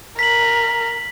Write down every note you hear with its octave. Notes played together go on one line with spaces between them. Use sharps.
A#4 B6 F#7